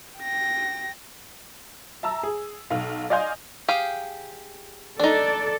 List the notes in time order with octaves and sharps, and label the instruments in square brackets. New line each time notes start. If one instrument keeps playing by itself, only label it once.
[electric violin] G5 A#6
[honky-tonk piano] E5 A5 A#5 E6
G#4
B1 F5
D5 D#5 F5 G#5 C6 G6
[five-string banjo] G4 G#4 F5
[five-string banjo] D4 D#4 [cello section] A4 D5